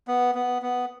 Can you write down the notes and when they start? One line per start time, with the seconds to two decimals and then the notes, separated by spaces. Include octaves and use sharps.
0.08 B3
0.35 B3
0.62 B3